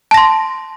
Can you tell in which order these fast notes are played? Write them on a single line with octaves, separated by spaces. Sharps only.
A5 A#6 C6